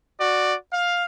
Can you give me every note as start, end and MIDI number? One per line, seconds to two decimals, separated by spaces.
0.19 0.54 66
0.19 0.54 74
0.72 1.05 77